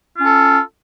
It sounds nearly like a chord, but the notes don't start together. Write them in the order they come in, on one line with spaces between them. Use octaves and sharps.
F4 C#4 A4